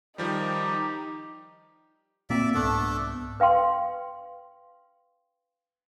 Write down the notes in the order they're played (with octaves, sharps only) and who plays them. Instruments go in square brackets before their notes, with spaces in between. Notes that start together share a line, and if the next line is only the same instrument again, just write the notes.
[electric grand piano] D#3 F3 G3 [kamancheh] D#4 [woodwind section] G4
[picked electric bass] A#2 A#3 C4 [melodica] D5 E5
[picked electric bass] C2 G#2 B3 [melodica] A3 D4 A4
[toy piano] B4 F5 G5 C6